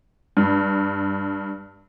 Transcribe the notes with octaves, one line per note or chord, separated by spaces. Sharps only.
G2